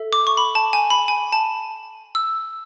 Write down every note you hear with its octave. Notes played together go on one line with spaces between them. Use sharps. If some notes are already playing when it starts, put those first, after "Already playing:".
Already playing: A4 E5
D6
C#6
B5
A5
G#5
B5
G#5
A5
E6